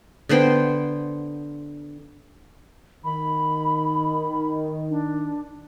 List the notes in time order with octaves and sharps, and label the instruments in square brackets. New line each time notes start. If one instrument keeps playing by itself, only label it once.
[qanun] D3 B3 C5 G5
[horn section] D#3 [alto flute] B5
[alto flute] D4